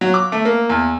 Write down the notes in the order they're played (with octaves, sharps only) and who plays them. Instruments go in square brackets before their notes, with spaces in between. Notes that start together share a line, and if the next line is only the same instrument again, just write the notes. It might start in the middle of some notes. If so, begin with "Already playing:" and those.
[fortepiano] F#3
D6
A3
A#3
E2